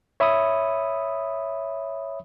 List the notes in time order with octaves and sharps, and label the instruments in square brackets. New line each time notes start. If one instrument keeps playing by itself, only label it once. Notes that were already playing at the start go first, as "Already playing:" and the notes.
[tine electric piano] C#5 E5 B5 C#6 D#6